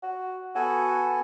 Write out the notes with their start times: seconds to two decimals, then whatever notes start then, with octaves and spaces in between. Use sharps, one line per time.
0.03 F#4
0.55 B3 F#4 A4 G#5